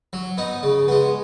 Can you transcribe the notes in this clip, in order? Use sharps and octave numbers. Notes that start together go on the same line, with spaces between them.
F#3
B3 D#4
C#3
G#3 B3